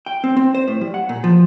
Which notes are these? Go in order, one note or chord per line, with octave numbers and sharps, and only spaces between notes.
G5
C4
C4
C5
A2
G3
F#5
A#2
F3